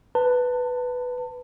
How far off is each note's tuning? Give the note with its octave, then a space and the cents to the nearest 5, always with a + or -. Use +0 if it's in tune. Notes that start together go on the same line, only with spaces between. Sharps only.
B4 +5 A5 +30